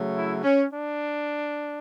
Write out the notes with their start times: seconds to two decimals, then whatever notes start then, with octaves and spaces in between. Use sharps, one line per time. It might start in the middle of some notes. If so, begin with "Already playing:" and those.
Already playing: C#3 F#3 A3
0.15 E4
0.44 C#4
0.72 D4